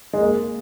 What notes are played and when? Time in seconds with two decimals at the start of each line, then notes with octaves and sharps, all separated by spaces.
0.13 G#3
0.20 A#3